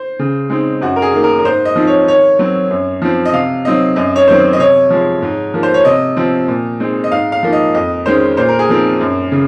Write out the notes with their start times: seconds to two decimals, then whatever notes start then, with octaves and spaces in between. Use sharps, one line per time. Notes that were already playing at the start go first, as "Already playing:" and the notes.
Already playing: C5
0.19 C#3
0.50 G#3 C4 D#4
0.81 F#2 F#4
0.96 A#4
1.02 G#4
1.13 D#3 A#3
1.24 A#4
1.39 A#4
1.45 G#2 C5
1.65 D#5
1.76 F3 C4 D#4
1.87 C#5
2.07 D#3 C#5
2.39 F#3 C4
2.70 F#2
3.02 F3 C4
3.25 D#5
3.33 C3 F5
3.65 F#3 C4 D#4 D#5
3.96 F#2 D#5
4.16 C#5
4.27 D#3 F#3 C4 C5
4.53 D#5
4.59 C3 C#5
4.90 F3 G#3
5.22 G#2
5.54 F3 A#3 D#4
5.63 C5
5.74 C#5
5.85 C3 D#5
6.17 F3 C4
6.48 A#2
6.80 G#3 C4 D#4
7.04 D#5
7.12 G#2 F5
7.32 F5
7.43 F3 A#3 D#4
7.53 D#5
7.74 F2 D#5
8.06 D#3 G#3 C#4 C5
8.37 A#2 C5
8.49 A#4
8.59 G#4
8.69 F3 C4 D#4 A#4
9.01 F#2
9.32 C#3